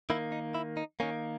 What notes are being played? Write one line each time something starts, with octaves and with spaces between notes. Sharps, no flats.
D#3 A#3 E4
D#4
E4
D#4
D#3 A#3 C#4